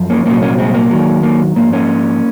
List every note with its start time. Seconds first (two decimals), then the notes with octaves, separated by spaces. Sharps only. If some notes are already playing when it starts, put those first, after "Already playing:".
Already playing: F#2 F3
0.10 A#3 C#4
0.26 C2 A#2 F#3 A#3 C#4
0.42 A#3 C#4
0.58 G#3 C4
0.74 A#3
0.90 D#2 D#3 F#3
1.23 A#3
1.56 G#2 F3 A#3
1.73 A#3 C#4